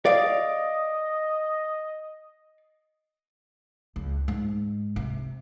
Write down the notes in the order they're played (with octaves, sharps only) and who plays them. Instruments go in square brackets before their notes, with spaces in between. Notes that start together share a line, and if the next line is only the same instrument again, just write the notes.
[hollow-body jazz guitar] D5 F5 [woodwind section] D#5
[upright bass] C#2
G#2
C3